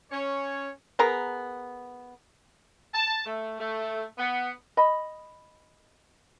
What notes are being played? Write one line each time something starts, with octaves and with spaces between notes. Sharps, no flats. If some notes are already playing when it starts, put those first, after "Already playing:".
C#4 C#5
B3 G#4 A#4 A#5
A5
A3
A3
B3
D#5 B5